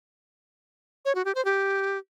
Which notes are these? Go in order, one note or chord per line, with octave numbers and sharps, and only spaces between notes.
C#5
F#4
G4
C5
G4